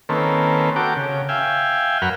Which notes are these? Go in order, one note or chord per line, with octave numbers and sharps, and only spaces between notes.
D#3 A#3 C4 C#4 A4 B4
F#4 A4 A#4 G5 D6
C#3
E5 F5 G5 G#5
F#2 A#4 F#5 B5 F6